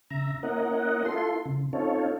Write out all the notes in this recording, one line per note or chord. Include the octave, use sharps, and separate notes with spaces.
C#3 E5 A#5
A#3 C#4 E4 A#4 D#5 F#5
E4 F4 A4 C6
C#3
C4 C#4 D#4 F4 A4 C#5